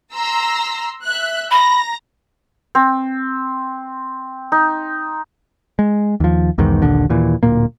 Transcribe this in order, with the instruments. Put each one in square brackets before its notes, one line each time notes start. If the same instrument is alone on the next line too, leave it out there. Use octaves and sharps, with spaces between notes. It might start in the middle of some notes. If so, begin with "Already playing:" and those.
[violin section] A#5 C6 E6
E5 F#6
[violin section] A#5 A#6 [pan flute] B5
[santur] C4
D#4
[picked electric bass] G#3
D#2 F3
B1 E2 G#2 D#3
D#1 A#1 D#2 D3
D#2 A#2 E3
D1 A#2 A#3